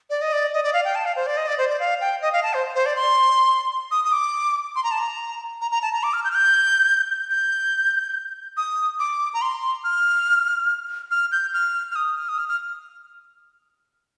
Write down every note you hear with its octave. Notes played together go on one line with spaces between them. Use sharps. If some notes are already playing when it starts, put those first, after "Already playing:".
D5
D#5
D5
D#5
D5
F5
G5
A5
F5
C5
D5
D#5
D5
C5
D5
F5
G5
D#5
F5
A5
C5
C5
D5
C6
D#6
D#6
D6
C6
A#5
A5
A#5
A#5
A#5
A5
A#5
D6
F6
G6
F6
G6
G6
D#6
D6
A#5
C6
F6
F6
G6
F6
F6
D#6
F6
D#6
F6
F6